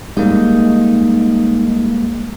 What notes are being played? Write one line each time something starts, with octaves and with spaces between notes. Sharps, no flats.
G3 G#3 A#3 D#4